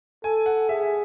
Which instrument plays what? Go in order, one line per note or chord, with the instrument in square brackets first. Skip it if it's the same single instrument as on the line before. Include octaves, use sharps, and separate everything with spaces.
[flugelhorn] A4 [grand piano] G#5
[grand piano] F#5
[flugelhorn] G#4 [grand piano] E5